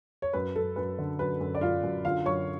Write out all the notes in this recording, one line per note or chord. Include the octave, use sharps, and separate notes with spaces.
C#5
F#2 B4
F#2 A4
F#2 B4
D3
F#2 B4
F#2
D5
F#2 F4 F5
F#2
D3 F4 F5
F#2 C#5 C#6